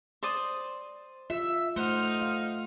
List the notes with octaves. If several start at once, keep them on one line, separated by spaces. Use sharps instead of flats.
C5 D5 D#6
F4 E5
A3 D#4 C5 F#5 F6
F5